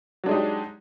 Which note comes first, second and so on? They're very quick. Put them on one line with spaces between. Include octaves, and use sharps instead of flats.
F#3 D4 G#3 D#4 G4